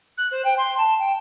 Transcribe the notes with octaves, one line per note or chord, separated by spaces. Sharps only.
F#6
C5
G5
C6
A5
G5